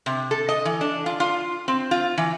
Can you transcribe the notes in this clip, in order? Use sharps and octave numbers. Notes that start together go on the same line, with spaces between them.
C3
A4
D#5
E3
D4
F4
F4
C4
F4
E3